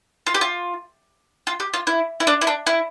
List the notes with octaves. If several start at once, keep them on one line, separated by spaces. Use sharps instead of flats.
F4
G4
F4
F4
G4
F4
E4
E4
D4
E4
D4
E4